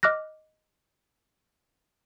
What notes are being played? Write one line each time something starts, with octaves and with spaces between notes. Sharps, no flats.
D#5 D6 F6 F#6 A#6